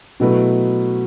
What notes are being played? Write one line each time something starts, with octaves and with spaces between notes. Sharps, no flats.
B2 F#3 A3 E4 B4